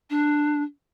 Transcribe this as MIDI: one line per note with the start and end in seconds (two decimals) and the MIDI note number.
0.10 0.63 62